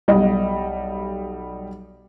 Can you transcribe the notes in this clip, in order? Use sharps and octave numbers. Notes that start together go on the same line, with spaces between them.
B1 G3 D#5